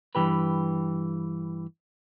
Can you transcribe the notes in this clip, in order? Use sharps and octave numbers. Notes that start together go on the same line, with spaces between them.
G2 D#3 E3 G4 B4